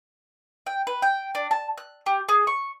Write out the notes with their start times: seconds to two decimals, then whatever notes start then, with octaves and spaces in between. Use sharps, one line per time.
0.66 G5
0.87 B4
1.02 G5
1.35 D4
1.51 A5
1.78 F#6
2.06 G4
2.29 G#4
2.47 C#6